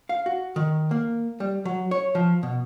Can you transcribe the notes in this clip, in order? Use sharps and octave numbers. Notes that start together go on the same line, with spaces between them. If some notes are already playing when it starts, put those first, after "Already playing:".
F5
F#4
D#3
A#3
G3
F#3
C#5
F3
B2